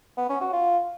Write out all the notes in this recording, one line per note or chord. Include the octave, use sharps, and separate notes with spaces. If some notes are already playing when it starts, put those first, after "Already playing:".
B3
C#4
F#4
F4